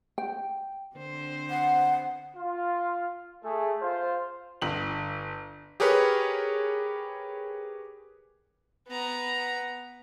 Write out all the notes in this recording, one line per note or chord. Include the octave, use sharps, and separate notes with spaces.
G5
D3 C4 C5
F#5
F4
A3 G#4
F4 C5
G1 F#7
G4 G#4 A#4 B4 C#5
B3 A#5